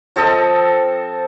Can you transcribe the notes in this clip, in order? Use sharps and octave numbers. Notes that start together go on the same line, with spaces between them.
F3 C4 A4 D#5